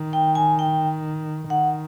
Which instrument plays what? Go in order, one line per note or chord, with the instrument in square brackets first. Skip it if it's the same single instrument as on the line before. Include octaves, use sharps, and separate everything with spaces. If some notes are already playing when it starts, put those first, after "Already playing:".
Already playing: [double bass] D#3
[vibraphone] G5
G#5
G5
[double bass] D#3 [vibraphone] F#5